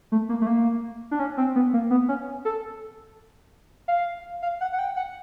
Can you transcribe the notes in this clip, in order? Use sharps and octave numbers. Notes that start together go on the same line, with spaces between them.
A3
A#3
A3
A#3
D4
C#4
C4
B3
A#3
B3
C#4
A4
F5
F5
F#5
F#5
G5
F#5